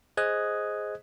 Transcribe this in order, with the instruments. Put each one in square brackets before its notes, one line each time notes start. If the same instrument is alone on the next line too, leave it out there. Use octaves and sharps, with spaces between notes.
[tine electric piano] G#4 C5 D#5 D#6 F#6 G#6